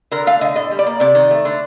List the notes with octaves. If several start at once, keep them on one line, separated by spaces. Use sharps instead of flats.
D3 A#4
A3 F5
D3 D#5
A2 D#5
G3
D5
A#3
C3 D5
D#3
A3
D3